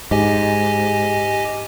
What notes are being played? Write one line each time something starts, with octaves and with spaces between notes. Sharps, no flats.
G#2 G4 D#5 G#5